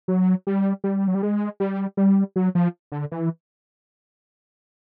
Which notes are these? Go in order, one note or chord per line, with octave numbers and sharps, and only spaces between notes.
F#3
G3
G3
F#3
G3
G#3
G3
G3
F#3
F3
D3
E3